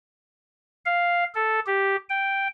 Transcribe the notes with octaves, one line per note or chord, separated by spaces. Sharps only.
F5
A4
G4
G5